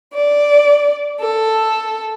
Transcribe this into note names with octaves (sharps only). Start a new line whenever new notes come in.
D5
A4